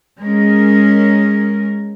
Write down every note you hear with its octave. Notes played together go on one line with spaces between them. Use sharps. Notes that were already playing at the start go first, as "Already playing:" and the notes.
G#3 C#4 A#4